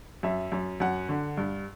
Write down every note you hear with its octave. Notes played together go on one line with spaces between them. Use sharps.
F#2 E5
F#2
F#2 F#5
D3
G2